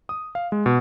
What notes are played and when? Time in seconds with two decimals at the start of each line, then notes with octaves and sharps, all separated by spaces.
0.09 D#6
0.35 F5
0.52 G#3
0.66 B2